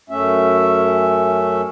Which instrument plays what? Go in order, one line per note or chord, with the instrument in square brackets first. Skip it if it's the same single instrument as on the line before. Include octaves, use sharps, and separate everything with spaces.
[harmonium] F#2 A3 C#4 E5